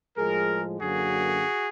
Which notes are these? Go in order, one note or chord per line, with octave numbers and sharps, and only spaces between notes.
A2 F3 G#3 G#4 A#4
F#2 D3 F#3 A#3 F#4 G#4